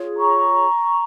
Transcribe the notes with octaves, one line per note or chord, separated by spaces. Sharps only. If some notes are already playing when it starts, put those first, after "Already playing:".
Already playing: F4 G#4 C#5
A#5 C#6